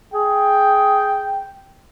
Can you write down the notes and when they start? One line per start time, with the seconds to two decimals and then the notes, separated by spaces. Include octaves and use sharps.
0.13 G#4 G5